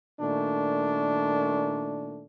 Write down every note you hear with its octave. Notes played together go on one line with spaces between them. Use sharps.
A#2 D#3 A3 D4